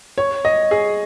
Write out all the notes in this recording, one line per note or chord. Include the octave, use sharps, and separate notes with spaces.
C#5
D#5
G#4